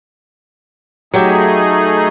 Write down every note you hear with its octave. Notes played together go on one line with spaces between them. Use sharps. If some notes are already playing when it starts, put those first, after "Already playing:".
F#3 A3 D#4 G4 G#4 E5